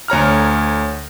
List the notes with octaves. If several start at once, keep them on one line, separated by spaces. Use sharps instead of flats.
D2 C#5 A#5 F6